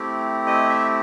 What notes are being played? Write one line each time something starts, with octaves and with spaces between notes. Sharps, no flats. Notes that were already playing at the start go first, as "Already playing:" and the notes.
Already playing: A3 C4 E4 G4
D#5
E5